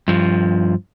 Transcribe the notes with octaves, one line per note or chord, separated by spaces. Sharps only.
G2 F3